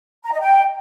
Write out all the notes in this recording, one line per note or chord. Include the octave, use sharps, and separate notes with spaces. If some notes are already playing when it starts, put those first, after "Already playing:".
A#5
D#5
G5